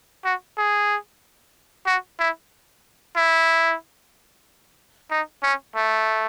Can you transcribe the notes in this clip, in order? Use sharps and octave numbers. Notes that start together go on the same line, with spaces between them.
F#4
G#4
F#4
E4
E4
D#4
C#4
A3